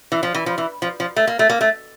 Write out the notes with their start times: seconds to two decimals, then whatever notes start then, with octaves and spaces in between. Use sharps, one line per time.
0.12 E3
0.23 F3
0.35 E3
0.46 F3
0.58 E3
0.82 F3
1.00 F3
1.16 A3
1.27 A#3
1.39 A3
1.50 A#3
1.61 A3